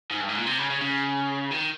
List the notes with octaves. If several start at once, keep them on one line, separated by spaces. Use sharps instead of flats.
G#2
G2
G#2
A#2
C3
C#3
C#3
C#3
D#3